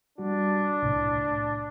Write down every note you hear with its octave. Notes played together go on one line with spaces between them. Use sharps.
G3 D4 F#4
C2 A2